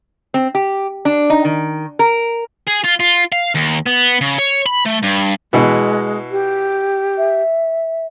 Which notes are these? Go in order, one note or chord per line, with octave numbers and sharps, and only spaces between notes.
C4
G4
D4
D#4
D#3
A#4
G#4
F4
F4
F5
D#2
B3
C#3
C#5
B5
A3
G2
B2 E3 G#3
G4
E5